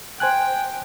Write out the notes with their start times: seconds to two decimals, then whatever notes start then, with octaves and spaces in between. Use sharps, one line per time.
0.20 C5 G5 G#5 F#6